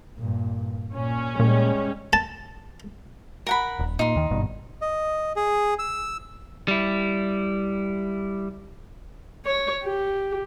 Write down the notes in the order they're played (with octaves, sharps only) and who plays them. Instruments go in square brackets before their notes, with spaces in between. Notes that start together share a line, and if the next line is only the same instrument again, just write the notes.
[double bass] G2 A#2
[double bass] A#2 [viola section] C#4
[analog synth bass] A#2 [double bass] G3 G#3
[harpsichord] A5
[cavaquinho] A#4 F#5 B5
[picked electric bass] D#1
[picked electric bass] A#2 [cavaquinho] D#4 C6
[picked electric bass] D#2 D#3
G#1 G2 B2
[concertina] D#5
G#4
E6
[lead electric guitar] G3 E4
[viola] C#5
G4